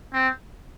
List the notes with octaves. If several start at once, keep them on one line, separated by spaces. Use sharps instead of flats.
C4